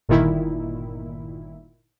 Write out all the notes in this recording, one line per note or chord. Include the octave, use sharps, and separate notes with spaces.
G1 A#2 D#3 E4